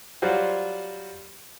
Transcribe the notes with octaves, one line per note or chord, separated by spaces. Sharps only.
F#3 G3 F4 F#4 C5